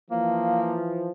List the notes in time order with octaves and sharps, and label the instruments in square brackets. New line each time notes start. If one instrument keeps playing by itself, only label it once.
[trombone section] E3 F3 [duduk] A#3